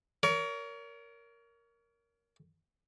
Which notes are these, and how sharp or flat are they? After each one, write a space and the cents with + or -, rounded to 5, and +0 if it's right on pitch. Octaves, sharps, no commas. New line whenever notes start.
A#4 +0 C#5 +35